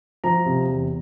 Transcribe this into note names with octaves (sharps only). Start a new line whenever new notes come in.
F3 A#5
C3
E2